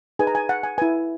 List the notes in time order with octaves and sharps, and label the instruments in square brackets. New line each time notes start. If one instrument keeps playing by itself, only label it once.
[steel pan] D#4 G#4 B4 G#5
A#5
G#5
F#5
G#5
E4 B4 G#5